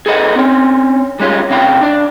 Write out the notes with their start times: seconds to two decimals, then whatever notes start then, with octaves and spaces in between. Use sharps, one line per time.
0.06 G#4 A4 B4 D#5 F#5
0.36 C4 C#4
1.20 G3 G#3 C#4 F4
1.50 C3 C#4 F5 G5 B5
1.81 D4 D5